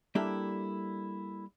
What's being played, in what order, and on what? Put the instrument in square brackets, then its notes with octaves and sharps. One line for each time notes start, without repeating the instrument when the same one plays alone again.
[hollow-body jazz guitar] G3 A#3 D4 E4 G4 A4